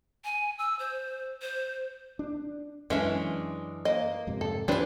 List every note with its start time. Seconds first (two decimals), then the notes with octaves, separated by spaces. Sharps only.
0.24 G#5
0.58 E6
0.79 C5
1.42 C5
2.19 D4
2.90 F#2 E3 G#3 C#4 D4 E5
3.85 A#3 D#5
4.27 F2 G#2 C3
4.41 A4
4.68 G2 E3 F3 G3 C4 D4 B4 C6